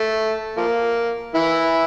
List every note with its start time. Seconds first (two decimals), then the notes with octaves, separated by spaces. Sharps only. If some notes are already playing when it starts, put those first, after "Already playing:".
Already playing: A3
0.57 F3 A#3
1.35 E3 E4